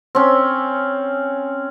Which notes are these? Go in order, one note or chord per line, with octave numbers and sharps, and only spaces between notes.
C4 C#4